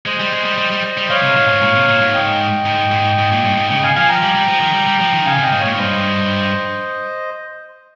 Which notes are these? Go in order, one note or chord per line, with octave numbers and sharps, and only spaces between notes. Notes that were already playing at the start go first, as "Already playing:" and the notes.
G#3 C5 D#5
G3
G#3
G3
G3
G3
G3
G3 C#5 F5
C3
G#2
G#2
A#2
C3
A#2
G#2
D#5 G5
G#2
G#2
G#2
A#2
G2
G#2
C#3 D#5 G5
F5 G#5
F3 F5 G#5
G5 A#5
G3
G3
F3
D#3
G3
G3
F3
D#3
C#3 F5 G#5
C3
D#5 G5
G#2
A#2 C#5 F5
G#2
G2 C5 D#5